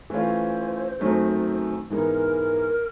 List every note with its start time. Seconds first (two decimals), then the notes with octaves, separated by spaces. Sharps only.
0.10 E3 A3 C#4 F4 C5
0.99 F#2 D#3 F#3 A3 C4
1.90 G#2 E3 G#3 B3 D#4 A#4